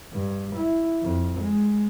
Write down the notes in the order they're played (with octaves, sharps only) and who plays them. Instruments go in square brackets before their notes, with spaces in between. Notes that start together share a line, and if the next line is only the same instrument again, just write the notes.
[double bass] G2
E4
F2
G#3